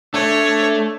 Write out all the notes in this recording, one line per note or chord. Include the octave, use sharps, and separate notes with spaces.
A3 D4 C#5